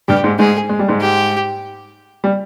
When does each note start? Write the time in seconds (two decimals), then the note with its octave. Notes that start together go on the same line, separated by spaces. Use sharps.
0.08 G2 G3 G4
0.24 G#2 G#3
0.39 G#2 G#3 G#4
0.69 G#3
0.79 G3
0.88 G#2 G#3
1.01 G4
2.24 G3